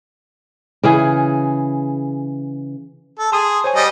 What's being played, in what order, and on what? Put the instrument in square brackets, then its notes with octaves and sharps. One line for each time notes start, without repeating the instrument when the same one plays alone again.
[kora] C#3 E3 G#4
[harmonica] A4
[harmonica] G#4 [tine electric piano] A5 C6 D#6
[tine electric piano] C5 C#5 G#5
[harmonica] G3 D#5